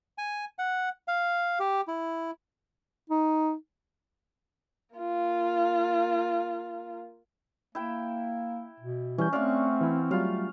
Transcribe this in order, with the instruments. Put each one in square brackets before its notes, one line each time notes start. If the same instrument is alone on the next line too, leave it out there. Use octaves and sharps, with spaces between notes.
[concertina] G#5
F#5
F5
G4
E4
[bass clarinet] D#4
[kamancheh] A#3 F4
[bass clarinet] A#3 [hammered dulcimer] E4 G5
[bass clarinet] B2
[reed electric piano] E3 G3 G6 [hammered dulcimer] C#4
[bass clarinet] A3 [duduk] C4 [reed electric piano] C#4 D5 [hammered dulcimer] F5 F#5 C#6
[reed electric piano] E3 E4
[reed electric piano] F#3 G3 F4 [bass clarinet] A3 [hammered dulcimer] F5